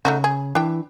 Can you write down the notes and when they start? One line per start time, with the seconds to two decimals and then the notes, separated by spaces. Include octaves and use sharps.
0.05 C#3 A3 D#4 F#4
0.24 G#4
0.55 E3 D4 G5